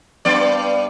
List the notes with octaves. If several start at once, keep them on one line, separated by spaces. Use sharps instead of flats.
G2 B3 D5